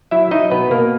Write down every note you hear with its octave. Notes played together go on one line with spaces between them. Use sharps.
F#3 E4 E5
F#3 D#4 D#5
B2 B3 B4
B2 A#3 A#4